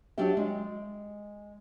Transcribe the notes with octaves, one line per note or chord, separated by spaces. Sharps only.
F#3 D4 F#4 G4 E5
G#3